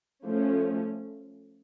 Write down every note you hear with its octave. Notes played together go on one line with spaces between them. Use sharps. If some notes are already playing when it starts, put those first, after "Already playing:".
F3 A3 C#4